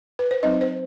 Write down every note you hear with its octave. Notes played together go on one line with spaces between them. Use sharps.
B4
C5
F#3 C4 D#4 D#5
C5